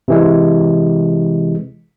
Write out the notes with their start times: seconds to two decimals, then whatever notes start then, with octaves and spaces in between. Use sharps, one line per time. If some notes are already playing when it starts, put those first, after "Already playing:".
0.08 C3 E3 G#3